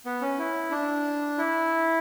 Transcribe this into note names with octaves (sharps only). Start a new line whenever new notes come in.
B3
C#4
E4
D4
E4